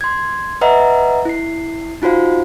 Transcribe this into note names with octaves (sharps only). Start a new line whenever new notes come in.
C6 G#6
B4 D#5 E5 F#5 A#5
E4 C7
D#4 F4 F#4 C5 F5